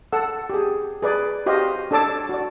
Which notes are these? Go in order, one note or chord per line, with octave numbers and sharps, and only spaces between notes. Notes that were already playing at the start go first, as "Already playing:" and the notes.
A4 F#5 E6
G4 G#4
G#4 B4 D5
F#4 G4 C5 D#5 F5
D4 A4 C#5 A5 D6 E6
F#4 D5